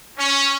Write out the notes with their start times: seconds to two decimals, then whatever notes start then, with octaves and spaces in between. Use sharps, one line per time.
0.18 C#4